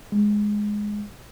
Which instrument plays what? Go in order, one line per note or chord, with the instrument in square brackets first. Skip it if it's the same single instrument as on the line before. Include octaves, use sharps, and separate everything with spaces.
[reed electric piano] G#3